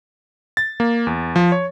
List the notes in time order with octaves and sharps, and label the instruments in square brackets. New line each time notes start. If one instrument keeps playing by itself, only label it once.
[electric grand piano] A6
A#3
E2
F3
C#5